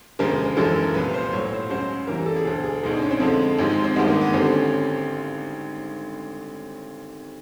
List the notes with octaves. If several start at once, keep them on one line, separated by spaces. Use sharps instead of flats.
E1 D2 C#3 F3 G#3 A#4
G#1 F#2 C#3 E3 G#3 A4
A#4
C2 A#2 F3 B4
C5
B1 A2 F#3 C#5
C#5
C5
C#2 C#3 F#3 C5
E2 C#3 E3 G3 A#4
A4
G#4
E1 D2 D3 A4
G#4
C#2 B2 G#3 D#4
D4
C#4
C4
F2 D3 F3 G#3
G#1 G#2 F3 G#3
C4
G#1 G2 D#3 G#3 B3
A#3
B3
G#1 G2 D3 G3 C4
C#4